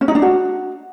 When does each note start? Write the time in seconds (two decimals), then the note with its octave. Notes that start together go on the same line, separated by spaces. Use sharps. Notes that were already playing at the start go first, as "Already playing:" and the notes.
0.01 C#4
0.08 D#4
0.15 D4
0.22 F#4